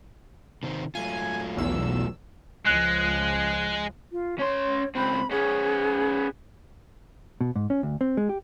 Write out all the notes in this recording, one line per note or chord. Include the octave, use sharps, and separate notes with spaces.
C3 D#3 C4
F#3 A3 F4 G#5
B1 E2 E6
C#2 F3 G#3 F#6
F4
C#4 C#5 C6
C#2 C4 B5
B3 C#4 G#4
B2
G#2
C#4
D2
C4
G#3
G4